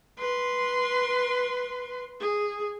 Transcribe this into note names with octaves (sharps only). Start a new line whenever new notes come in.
B4 C6
G#4